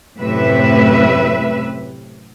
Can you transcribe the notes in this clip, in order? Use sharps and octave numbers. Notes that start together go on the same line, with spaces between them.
F#2 A2 C3 B4 E5